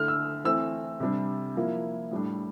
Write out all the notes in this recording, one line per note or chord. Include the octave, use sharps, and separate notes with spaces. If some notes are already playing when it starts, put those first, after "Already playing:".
Already playing: D3 A3 E4 F6
E6
E3 A3 C4 E4 E6
C3 G3 D4
F3 A#3 E4
A2 G3 D4